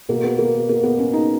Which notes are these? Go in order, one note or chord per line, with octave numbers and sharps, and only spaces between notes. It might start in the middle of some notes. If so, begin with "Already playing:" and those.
B2 A#3
B3
A#3
A#3
B3
C#4
D#4